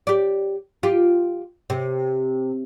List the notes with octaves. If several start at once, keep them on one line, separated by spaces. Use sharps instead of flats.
G4 D5
F4 G4
C3